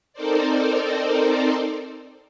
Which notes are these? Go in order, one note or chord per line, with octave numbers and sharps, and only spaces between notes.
C4 D#4 A4 A#4 C5 D5